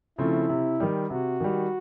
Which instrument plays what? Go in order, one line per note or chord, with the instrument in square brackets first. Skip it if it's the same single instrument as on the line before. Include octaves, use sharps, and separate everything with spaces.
[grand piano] C#3 F3 A3 C4 [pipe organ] E4
[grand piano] C3
D#3 G3
[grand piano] C3 [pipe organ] F#4
[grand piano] D#3 G3